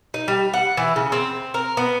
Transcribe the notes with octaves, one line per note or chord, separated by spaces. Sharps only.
D#4
G3
F#5
E3
C#3
C4
A#4
B3